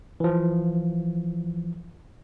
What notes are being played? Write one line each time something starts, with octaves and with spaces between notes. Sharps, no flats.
E3 F3